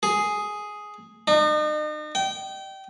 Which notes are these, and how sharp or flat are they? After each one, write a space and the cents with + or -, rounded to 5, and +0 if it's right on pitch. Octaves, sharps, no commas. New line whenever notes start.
G#4 +5
D#4 -40
G5 -25